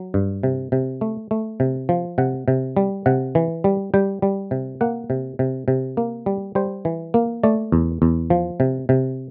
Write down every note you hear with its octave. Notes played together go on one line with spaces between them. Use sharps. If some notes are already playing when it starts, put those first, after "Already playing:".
Already playing: F#3
G2
C3
C3
A3
A3
C3
F3
C3 F#5
C3
G3
C3 F#5
E3
G3
G3 G5
G3
C3
A#3 F#5
C3
C3
C3
A#3
G3
G3 C5
E3
A#3
A3 D5
E2
E2
F3
C3
C3